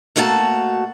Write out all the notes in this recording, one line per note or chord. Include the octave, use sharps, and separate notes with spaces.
B2 A3 A#3 F#4 G#5 A5